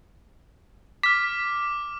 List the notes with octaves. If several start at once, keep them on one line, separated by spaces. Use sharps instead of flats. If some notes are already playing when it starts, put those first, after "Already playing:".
D6 F6 B6